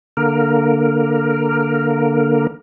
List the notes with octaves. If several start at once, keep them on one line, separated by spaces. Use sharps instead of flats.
D3 A#3 A#4